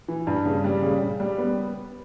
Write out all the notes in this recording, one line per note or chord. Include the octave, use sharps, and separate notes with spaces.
E3
G2
C#3
G3
C#3
C#3
G3
B3